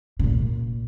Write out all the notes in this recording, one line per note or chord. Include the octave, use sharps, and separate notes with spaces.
C#3
A#2